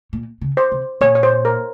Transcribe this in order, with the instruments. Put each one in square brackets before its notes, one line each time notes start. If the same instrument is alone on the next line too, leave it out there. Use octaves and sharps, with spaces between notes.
[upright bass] A#2
C#3
[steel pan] C5
[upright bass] C3
[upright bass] A#2 [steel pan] C#5
[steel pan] C#5
C5
A#4